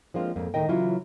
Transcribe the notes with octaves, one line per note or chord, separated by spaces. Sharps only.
F3 G#3 A#3 C4 D4 F4
F2 G#2 A#3
D2 A2 D#3 A#4 D#5 G5
C#3 E3 F#3 C#4 E4 F4